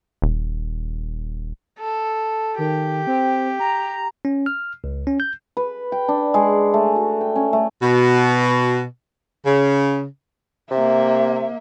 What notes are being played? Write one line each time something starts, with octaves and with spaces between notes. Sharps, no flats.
D#1
A4
D#3 G4
C4
A#5
C#4
F6
C#2
C#4
G6
B4
G5
D4
G#3
A3
F#4
G5
C#4
A3
B2
C#3
C3 A#3 E5